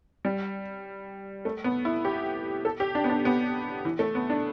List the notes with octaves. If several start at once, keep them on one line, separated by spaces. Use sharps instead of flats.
G3
A3
B3
E4
G4
A4
G4
D4
B3
D4
B3
E3
A3
B3
D4